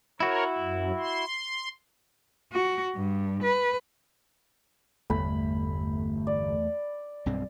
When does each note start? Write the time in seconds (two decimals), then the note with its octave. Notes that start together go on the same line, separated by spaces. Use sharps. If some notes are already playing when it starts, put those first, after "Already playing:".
0.20 E4 F#4 A#4 C#5
0.58 F#2
0.99 C6
2.52 F#4
2.95 G2
3.43 B4
5.10 G1 E2 A3 B5
6.27 D5
7.26 B1 G2 C4